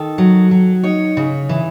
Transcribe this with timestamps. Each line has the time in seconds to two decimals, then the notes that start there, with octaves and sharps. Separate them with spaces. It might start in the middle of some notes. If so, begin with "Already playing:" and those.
Already playing: D#3 A4
0.18 F#3
0.51 F#3
0.84 D#4 C#5
1.17 C#3
1.49 E3